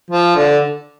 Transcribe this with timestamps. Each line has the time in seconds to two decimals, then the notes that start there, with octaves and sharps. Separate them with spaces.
0.11 F3
0.36 D3